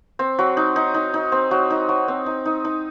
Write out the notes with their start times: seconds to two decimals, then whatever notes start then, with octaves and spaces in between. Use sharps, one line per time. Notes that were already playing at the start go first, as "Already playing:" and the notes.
0.19 C4
0.39 F#3
0.57 D#4
0.76 D#4
0.94 D#4
1.14 D#4
1.32 C4
1.51 F#3
1.70 D#4
1.89 F#3
2.08 C4
2.26 D#4
2.46 D#4
2.65 D#4